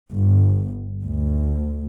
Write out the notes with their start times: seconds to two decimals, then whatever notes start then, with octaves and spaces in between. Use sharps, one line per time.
0.12 G1
1.04 D2